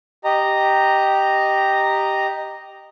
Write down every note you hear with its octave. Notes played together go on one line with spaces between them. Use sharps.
G4 D#5 A#5